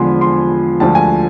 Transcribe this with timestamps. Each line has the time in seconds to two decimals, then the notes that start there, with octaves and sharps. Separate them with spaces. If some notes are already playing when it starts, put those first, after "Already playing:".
Already playing: E2 D3 F3 G#3 G#5 B5 C6
0.21 C6
0.80 D2 D3 F3 G#3 A5
0.95 G#5